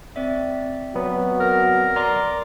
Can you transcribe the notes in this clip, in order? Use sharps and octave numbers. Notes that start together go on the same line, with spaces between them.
C4 D5 E5
F#3 B3 F#4
A#4
D5 A#5 C6 D6